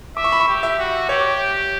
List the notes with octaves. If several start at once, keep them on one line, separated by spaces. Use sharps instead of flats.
E5 D6
C#6
B5
C#6
G4
E5
F#4
G4 C#5